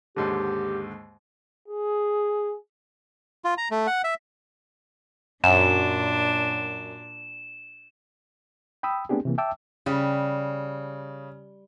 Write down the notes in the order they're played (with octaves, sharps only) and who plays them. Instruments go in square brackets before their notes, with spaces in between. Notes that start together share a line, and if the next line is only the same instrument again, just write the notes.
[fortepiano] D#2 G#2 D3 [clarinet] G4
[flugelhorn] G#4
[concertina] F4
A#5
A3
F#5
E5
[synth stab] F#2 [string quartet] A#2 D4 [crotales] E7
[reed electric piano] G5 B5 D#6 E6
A3 B3 C4 D4 G4 G#4
C3 E3 A#3
E5 G5 A5 D6 E6
[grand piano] C#3 [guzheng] G3